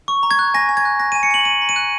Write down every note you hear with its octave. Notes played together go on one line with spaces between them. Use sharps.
C#6
A#5
G#6
F#6
G#5 A#6
G#5
G#6
F#6
F#6 A#6
G#5 D#7
C#7
G#5 F#7
A#5 D#7
A#5
D#7
F#6